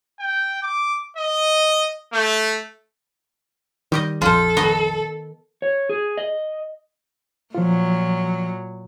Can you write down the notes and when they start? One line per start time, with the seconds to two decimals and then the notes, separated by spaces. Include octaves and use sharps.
0.19 G5
0.63 D6
1.17 D#5
2.13 A3
3.92 D#3 G3 G4 D#5
4.22 A#1 F2 F4 A4 C5
4.57 D#3 B3 D#5
5.62 C#5
5.89 G#4
6.17 D#5
7.55 A#2 F3 F#3 F4